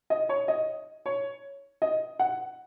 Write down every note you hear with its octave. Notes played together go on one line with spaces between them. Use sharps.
D#5
C#5
D#5
C#5
D#5
F#5